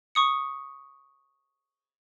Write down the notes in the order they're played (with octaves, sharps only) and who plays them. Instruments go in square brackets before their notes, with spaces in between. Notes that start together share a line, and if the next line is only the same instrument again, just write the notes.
[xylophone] C#6 D#6 C#7